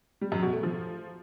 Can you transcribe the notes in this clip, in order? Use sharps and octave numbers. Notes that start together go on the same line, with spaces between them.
G3
F#2
B2
A3
F3